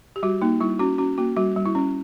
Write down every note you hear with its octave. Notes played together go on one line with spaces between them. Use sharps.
G4
G3 F#4
A#3 D#4
G3 E4
C#4 F#4
C#4 F#4
A#3 F#4
G3 F#4
G3
E4
C#4